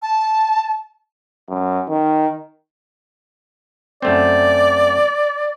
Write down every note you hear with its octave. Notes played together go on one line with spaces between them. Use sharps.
A5
F#2
D#3
F#2 A3 C4 D5